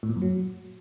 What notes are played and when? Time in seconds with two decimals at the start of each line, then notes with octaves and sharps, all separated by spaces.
0.03 A2
0.09 A#2
0.16 F#2
0.22 F#3